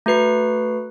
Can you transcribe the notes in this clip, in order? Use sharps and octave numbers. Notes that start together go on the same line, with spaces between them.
A3 F#4 B4 C7